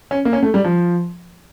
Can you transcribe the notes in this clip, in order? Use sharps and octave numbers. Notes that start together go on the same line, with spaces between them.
C#4
A#3
C#4
A3
G3
F3